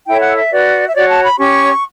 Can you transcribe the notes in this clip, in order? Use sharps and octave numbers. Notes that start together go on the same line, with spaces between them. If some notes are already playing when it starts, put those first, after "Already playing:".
E4 A4 C#5 G5
F#5
E5
F#4 B4 D5
E5
F#4 C#5 D5
A5
B5
C#4 G4 C#5 C#6